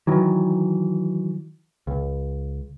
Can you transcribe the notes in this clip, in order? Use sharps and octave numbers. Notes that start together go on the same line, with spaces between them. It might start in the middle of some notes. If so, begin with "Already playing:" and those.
D#3 E3 F#3
C#2